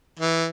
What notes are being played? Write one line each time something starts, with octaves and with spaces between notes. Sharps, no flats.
E3